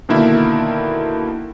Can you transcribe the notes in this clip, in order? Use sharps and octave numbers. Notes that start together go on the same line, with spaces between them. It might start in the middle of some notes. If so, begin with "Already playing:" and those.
B2 D3 D#3 A#3 E4 E5